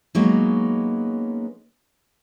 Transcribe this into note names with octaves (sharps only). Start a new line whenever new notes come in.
F#3 G#3 A#3 B3 C#4 D#4